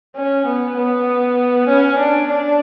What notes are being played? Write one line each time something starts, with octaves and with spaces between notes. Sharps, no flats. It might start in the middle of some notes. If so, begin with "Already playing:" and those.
C#4
B3
B3
C#4
D4
D4